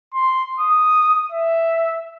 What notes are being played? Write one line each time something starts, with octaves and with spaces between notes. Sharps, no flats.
C6
D#6
E5